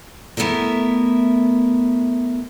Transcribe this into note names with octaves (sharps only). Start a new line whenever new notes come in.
A3 B3 E4 A4 A#4